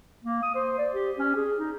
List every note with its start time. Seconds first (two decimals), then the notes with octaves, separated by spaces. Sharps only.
0.24 A#3
0.43 D#6
0.55 C5
0.78 D5
0.94 G4
1.18 C#4
1.36 G#4
1.59 D#4